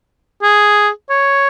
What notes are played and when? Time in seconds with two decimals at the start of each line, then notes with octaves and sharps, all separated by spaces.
0.43 G#4
1.09 C#5